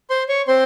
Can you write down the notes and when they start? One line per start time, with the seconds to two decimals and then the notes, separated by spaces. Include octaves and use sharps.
0.10 C5 C6
0.29 C#5 C#6
0.48 C4 C5 C6